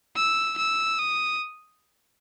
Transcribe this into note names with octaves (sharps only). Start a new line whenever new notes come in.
E6
E6
D#6